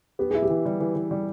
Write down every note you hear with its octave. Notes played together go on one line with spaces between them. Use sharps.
B3 G4
E4 G#4
G4
E3
G3
E3
E3
G3